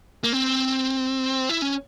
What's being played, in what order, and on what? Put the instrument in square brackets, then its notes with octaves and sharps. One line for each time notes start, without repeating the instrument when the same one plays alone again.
[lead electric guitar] A#3
C4
E4
C#4